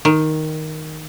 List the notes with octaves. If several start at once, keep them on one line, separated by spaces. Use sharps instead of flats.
D#3